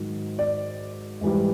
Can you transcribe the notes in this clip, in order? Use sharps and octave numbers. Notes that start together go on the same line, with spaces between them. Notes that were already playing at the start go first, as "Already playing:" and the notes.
Already playing: G#2 D#3 F#3
D5
G#2 E3 G3